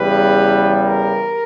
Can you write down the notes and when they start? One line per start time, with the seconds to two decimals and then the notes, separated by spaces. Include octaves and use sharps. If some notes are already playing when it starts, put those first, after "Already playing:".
Already playing: E2 C#3 G3 B4
0.80 A#4